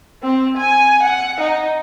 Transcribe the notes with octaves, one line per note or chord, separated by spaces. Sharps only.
C4
G#5
F#5
D#4